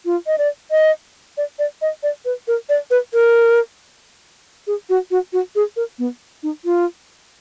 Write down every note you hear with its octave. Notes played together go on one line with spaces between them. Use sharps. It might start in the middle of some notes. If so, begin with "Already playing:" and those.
F4
D#5
D5
D#5
D5
D5
D#5
D5
B4
A#4
D5
B4
A#4
G#4
F#4
F#4
F#4
G#4
A#4
B3
D#4
F4